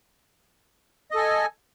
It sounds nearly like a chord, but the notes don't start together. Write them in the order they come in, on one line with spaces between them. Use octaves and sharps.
D#5 A4 G#5